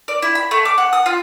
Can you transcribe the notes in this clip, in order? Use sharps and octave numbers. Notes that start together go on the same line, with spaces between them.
D5
E4
B5
A3
D6
F#5
D#6
F4